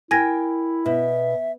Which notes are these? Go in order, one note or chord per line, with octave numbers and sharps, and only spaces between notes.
E4 A#4 G5 G#5 G#6 A#6
B2 E5